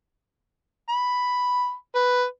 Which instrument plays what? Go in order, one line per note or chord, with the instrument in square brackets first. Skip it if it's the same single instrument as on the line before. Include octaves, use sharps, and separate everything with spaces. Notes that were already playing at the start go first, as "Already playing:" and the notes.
[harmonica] B5
B4